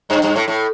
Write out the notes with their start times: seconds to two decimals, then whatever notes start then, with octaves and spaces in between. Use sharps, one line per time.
0.10 G2
0.23 G2
0.36 A2
0.48 A2